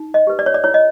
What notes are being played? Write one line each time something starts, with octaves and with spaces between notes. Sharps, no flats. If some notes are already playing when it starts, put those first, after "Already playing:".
Already playing: D#4
D#5
G4 B4
D5
C#5
D5
E4 C#5
D#5